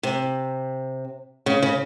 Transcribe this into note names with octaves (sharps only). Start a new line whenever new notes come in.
C3
C#3
C#3